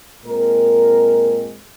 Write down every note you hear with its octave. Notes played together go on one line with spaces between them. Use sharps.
A#2 G#3 C4 A#4